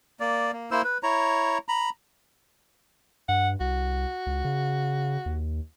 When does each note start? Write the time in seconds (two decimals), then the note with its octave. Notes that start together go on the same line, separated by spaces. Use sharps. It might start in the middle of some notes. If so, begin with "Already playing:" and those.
0.20 A#3 D5
0.53 A#3
0.71 A#3 E4 C5 E6
0.84 B4
1.03 E4 C#5 A#5
1.69 A#5 B5
3.29 G2 F#5
3.60 C2 F#4
4.26 C#2
4.45 C#3
5.26 D#2